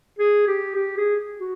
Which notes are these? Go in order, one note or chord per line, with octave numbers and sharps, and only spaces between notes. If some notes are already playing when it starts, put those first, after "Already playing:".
G#4
G4
G4
G#4
F#4